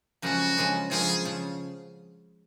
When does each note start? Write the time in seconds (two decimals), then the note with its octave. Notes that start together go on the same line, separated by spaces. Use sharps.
0.22 F#2 C#3 F3 G#3 C#4 F#4
0.57 F#2 C#3 F3 G#3 C#4
0.91 F#2 C#3 F3 G#3 C#4 G#4
1.25 C#3 F3